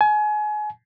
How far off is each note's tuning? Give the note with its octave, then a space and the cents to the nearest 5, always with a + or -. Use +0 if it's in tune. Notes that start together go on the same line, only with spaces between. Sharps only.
G#5 +30